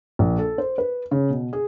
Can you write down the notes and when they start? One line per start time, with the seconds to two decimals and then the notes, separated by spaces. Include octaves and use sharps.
0.19 A#1
0.39 A4
0.58 C5
0.78 B4
1.11 C#3
1.30 B2
1.53 G#4